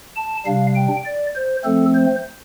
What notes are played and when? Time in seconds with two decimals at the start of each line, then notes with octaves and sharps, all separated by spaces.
0.16 A5
0.46 C3 G3 D4 F5
0.76 G5
1.05 D5
1.35 C5
1.64 F3 A3 C4 A4
1.94 C5